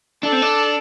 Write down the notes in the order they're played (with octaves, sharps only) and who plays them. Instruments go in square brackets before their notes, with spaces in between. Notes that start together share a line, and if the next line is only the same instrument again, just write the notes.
[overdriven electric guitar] D4 [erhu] A4
[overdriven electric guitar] C4
D4